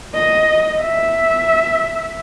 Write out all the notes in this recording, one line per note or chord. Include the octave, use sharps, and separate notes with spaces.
D#5
E5